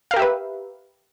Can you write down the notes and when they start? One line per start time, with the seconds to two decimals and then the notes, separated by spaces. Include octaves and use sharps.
0.11 F5
0.14 A#4
0.16 G4
0.19 E5
0.22 B4